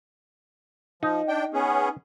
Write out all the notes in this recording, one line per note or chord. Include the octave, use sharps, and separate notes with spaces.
F3 D#4
D4 G5
B3 C#4 G#4